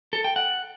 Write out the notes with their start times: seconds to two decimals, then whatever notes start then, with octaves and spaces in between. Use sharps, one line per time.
0.13 A4
0.24 G5
0.36 F#5